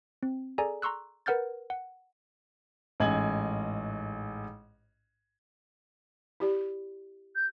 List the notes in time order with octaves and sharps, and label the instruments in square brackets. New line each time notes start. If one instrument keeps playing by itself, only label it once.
[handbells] C4
G#4 A4 D5 G#5 A#5
A#5 C6 C#6 E6 F#6
A#4 B4 F#5 F6 G6 A6
F#5
[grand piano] A1 G#2 D#5 G#5 G#6 F#7
[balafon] E4 G4 D5
[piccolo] G6